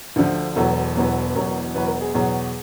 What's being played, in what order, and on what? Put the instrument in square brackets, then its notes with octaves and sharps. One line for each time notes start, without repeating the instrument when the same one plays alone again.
[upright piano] D2 D3 F3
E1 E2 B2 F#3 A4
E1 E2 B2 F#3
E1 E2 B2 F#3 A#4
E1 E2 B2 F#3 B4
A#4
G#4
E2 B2 F#3 G#4